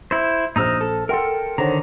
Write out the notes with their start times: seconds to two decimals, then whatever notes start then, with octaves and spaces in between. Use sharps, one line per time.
0.11 E4 C5
0.56 A#1 D#4 C5 A#5 E6 F6
0.81 A4
1.09 A4 A#4 F#5 G5 C6
1.58 D3 D#3 C5 C#5 F#5 A#5